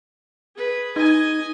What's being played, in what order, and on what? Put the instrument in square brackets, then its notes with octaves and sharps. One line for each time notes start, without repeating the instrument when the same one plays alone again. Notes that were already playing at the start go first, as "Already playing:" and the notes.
[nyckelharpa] G#4 B4
[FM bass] D#4 [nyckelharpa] D#5 G#5